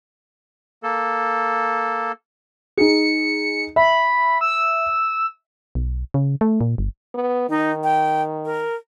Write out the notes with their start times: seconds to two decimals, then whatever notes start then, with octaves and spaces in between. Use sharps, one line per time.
0.83 A#3 A4
2.77 D#4 G#4 C#7
3.76 E5 B5
4.41 E6
5.75 B1
6.14 C#3
6.41 A3
6.61 A#2
6.78 G1
7.14 B3
7.49 D#3 D#4
7.84 G5
8.45 A#4